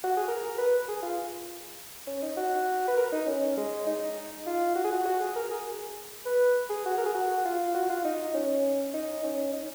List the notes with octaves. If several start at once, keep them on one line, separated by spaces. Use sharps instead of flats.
F#4
G#4
A#4
B4
G#4
F4
C#4
D#4
F#4
B4
A#4
D#4
C#4
G#3
D#4
F4
F#4
G#4
F#4
F#4
G#4
A#4
G#4
B4
G#4
F#4
A#4
G#4
F#4
F4
F#4
F4
D#4
C#4
D#4
C#4
D#4